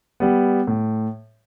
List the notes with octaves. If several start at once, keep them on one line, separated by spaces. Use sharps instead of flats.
G3 B3
A2